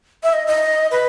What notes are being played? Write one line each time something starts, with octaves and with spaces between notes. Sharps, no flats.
E5
D#5
D#5
B4